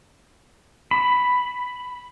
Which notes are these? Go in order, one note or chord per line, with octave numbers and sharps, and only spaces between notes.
B5